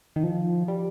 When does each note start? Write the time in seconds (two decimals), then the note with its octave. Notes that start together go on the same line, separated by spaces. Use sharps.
0.16 D#3
0.23 F3
0.68 G3